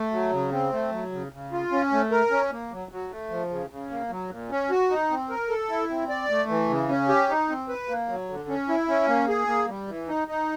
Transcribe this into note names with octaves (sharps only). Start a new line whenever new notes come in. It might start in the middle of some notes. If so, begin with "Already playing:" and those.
Already playing: A3
F#3
C#3
C4
A3
F#3
C#3
C#3
F4
C#4
A3
A#4
C#4
A#3
F#3
F#3
A3
F3
C#3
C#3
A#3
F#3
A#2
C#4
F#4
D#4
C4
A#4
A4
E4
C4
D5
A3
E3
C#3
C#4
G4
D#4
C4
B4
A#3
F#3
D3
C#4
E4
C#4
A#3
G#4
A#3
G3
E3
D#4
D#4